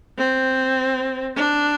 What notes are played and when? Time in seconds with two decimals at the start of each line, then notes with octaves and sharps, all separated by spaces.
0.18 C4
1.35 D4